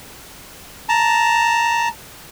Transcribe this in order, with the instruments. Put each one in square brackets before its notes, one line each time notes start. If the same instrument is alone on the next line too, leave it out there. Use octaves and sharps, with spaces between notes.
[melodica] A5 A#5